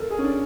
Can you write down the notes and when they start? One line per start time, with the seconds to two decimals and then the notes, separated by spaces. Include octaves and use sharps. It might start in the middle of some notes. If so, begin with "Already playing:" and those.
Already playing: A4 A#4
0.10 G#4
0.18 C#4
0.24 D4